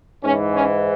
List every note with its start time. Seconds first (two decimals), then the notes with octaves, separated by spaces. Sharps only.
0.23 G#2 E3 C#4
0.54 C#4